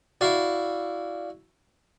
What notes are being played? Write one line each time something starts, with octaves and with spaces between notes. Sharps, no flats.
E4 F#4 D5 F5